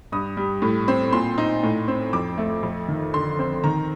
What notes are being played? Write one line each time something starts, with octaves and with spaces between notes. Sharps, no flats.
G2 D#6
G3
A2
C4
A#2 C6
D#4
A2
C4
F2 D6
A3
F2
D#3
D3 C6
C4
D#3 A#5